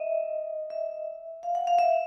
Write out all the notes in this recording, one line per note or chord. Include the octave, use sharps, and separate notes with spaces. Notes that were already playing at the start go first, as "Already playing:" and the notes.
Already playing: D#5 E5
E5
F5
F#5
F5
E5